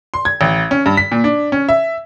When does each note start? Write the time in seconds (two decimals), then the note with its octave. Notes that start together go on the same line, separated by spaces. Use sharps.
0.14 C6
0.25 G#6
0.41 A1
0.71 C#4
0.86 G2
0.97 B6
1.12 A#2
1.24 D4
1.52 C#4
1.69 E5